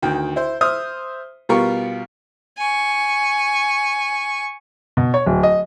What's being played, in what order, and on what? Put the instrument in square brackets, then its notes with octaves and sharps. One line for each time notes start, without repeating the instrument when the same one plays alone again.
[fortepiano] D2 D#3 G5
E4 C5
C5 E5 D#6 F6
B2 G3 B3 F4 A#4 C#6
[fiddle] G#5 C#6
[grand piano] B2
C#5
D1
D#5